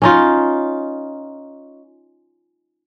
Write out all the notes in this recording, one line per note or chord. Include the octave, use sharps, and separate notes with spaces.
C#4 D#4 F4